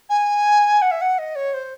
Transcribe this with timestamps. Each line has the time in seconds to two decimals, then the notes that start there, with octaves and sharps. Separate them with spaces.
0.09 G#5
0.82 F#5
0.91 E5
1.01 F#5
1.18 D#5
1.35 C#5
1.54 C5